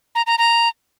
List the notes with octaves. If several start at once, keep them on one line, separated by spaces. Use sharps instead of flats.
A#5
A#5
A#5